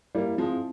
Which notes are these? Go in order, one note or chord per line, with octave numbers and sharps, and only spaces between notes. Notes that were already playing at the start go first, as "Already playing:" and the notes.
G3 A#3 E4
F3 G#3 C4